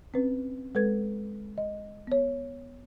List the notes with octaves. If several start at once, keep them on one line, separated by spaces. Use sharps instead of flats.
C4 C#4 B4
G#3 A4 B4 G#6
D#5
B3 C#5